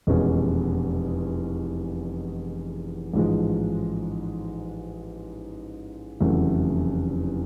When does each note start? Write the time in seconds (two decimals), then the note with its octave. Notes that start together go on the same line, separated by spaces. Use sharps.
0.07 F1 E2 B2 G#3 C#4
3.13 A1 G#2 F3 G#3
6.21 F1 E2 C#3 F#3 A3